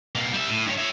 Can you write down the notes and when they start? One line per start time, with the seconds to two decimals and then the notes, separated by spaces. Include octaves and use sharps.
0.15 B2 A#3
0.33 G3 E5
0.49 A2
0.66 G2 C#5
0.78 C#5 E5